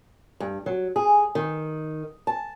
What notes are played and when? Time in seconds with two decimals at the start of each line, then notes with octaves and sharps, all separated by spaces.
0.40 G2
0.66 F#3
0.96 G#4
1.35 D#3
2.27 A5